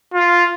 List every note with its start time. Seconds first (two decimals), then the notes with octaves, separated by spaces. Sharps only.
0.14 F4